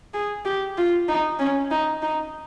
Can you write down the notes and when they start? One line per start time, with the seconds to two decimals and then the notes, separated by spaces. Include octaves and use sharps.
0.14 G#4
0.45 G4
0.77 F4
1.09 D#4
1.39 C#4
1.71 D#4
2.02 D#4